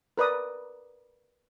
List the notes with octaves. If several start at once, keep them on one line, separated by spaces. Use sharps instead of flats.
A#4 B4 D5 D#6